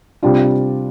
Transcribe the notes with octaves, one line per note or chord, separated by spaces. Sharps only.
C3 G3 D4 F4